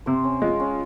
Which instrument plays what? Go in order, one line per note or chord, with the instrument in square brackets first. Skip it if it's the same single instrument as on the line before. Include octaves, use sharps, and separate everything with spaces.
[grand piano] C3 [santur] C5
[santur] C#4
[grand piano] G#3 [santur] F4
[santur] C#4